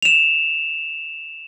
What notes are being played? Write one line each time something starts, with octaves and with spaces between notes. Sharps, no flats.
E7 F7